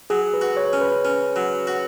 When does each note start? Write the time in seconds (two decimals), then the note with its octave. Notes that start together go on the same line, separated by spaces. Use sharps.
0.10 F#3 G#4
0.34 B4
0.41 F#4
0.57 C#5
0.73 C#4
0.81 B4
1.05 C#4
1.36 F#3
1.67 F#4